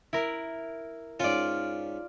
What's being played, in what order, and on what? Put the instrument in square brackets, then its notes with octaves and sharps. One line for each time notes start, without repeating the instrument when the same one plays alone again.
[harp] E4 A#4
[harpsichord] G#2 C#4 [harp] F4 D5